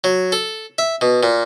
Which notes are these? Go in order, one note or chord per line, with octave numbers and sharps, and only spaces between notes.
F#3
A4
E5
B2
A#2